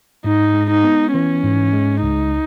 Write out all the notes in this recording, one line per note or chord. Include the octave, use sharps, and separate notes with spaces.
G#2 D#4
G#3
D#4
B3
E3 C#4
G#2
G#3
C#2 D#4